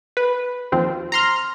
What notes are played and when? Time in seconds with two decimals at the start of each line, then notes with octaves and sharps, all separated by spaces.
0.17 B4
0.72 D#2 F3 C4
1.12 A#5 C6 F6